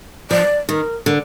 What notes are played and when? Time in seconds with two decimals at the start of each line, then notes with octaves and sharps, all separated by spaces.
0.31 F3 D5
0.69 D#3 A#4
1.06 D3 A#4